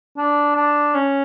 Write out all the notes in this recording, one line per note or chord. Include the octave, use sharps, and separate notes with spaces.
D4
D4
C#4